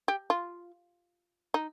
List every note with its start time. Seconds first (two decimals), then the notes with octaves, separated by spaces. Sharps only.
0.08 G4
0.30 F4
1.54 D#4